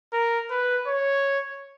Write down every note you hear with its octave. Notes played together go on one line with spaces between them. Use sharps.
A#4
B4
C#5